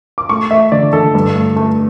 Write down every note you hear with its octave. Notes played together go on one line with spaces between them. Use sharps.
D6
A3 C#6
A3 E5
D3 D5
D3 A4
G2
A3
A3